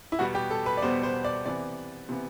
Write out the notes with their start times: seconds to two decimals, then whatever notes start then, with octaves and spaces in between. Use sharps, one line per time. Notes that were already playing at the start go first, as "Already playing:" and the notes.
0.12 E4
0.19 E2 B2 G3 B3 F#4
0.35 G4
0.50 A4
0.66 B4
0.77 D5
0.82 E2 B2 G3 B3 C5
1.03 C5
1.24 D5
1.45 C3 E3 B3 D5
2.09 C3 E3 B3